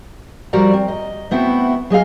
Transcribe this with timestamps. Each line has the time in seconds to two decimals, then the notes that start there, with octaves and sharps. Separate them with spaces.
0.53 F3 G3 F#4 A#4 D5 A#5
0.74 C4
0.88 D#5
1.31 A3 B3 C4 E4 F#4
1.90 F#3 G#4 D#5 F5